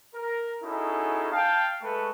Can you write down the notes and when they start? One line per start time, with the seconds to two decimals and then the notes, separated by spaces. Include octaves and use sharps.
0.15 A#4
0.63 C#4 D#4 E4 F#4 G#4 A4
1.32 F5 G5 A5
1.82 G#3 A3 A4 B4 C#6